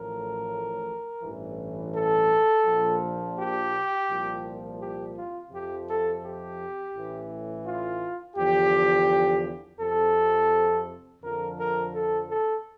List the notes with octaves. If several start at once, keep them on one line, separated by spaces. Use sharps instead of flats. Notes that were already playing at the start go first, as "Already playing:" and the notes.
Already playing: A1 A2 F3 A#4
A1 G2 E3
A4
A#1 A#2 F3
G4
C2 A#2 F3
G4
F4
F2 C3 F3 G4
A4
G4
A1 A2 E3
F4
E2 D3 F3 G4
F2 C3 F3 A4
F2 D3 F3 A#4
A#4
A4
A4